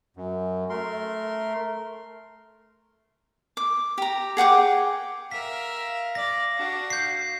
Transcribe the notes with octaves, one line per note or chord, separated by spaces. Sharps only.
F#2
A3 A#4 C6
D6
G4 A#5
G#4 F#5 G5 D6
A#4 E5 F5 B6
D5 A#6
D4 F#4
G6 C7